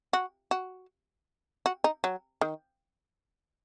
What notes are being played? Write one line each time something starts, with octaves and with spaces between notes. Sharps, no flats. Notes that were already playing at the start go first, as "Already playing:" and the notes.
F#4
F#4
F#4
D#4
F#3
D#3